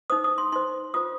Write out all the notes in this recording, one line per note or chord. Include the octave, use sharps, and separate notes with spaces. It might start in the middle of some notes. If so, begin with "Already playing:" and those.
D#4 C5 D#6
D#6
C6
D#4 C5 C6
F4 C5 D#6